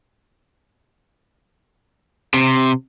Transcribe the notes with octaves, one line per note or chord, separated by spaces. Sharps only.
C3